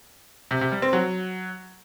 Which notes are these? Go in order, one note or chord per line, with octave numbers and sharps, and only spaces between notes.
C3
C3
G3
C4
F#3